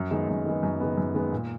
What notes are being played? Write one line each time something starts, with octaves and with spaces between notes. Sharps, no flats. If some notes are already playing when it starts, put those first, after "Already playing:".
Already playing: F#2
D#3 G#3 B3
F#2
D#3 G#3 B3
F#2
D#3 G#3 B3
F#2
D#3 G#3 B3
A#2